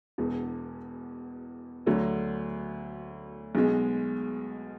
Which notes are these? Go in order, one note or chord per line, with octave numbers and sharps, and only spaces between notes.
E1 E2 B2
D2 D3 F#3
B1 B2 G#3